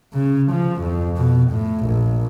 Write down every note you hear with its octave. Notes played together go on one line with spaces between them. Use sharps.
C#3
F3
F2
B2
A2
A#1